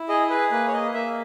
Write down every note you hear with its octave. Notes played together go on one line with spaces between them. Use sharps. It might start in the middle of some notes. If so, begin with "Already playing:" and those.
Already playing: E4
G#4 D#5
G#4 B4
A#3 B4
C#5
A#3 D#5
A#3 E5